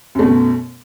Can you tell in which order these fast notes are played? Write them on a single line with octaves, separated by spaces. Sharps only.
F#2 A3 B2